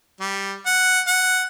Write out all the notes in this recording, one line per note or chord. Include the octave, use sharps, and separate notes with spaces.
G3
F#5
F#5